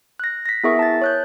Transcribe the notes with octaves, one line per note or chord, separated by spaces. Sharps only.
F#6 A#6
A#6 B6
B3 E4 G#4 A#4 E5 C#6
A5 A6
C#5 F#6 G6